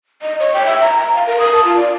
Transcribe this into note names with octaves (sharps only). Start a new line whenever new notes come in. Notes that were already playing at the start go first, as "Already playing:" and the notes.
D#5
C#5
G5
E5
A#5
A#5
F5
A#4
D#6
A5
F4
D5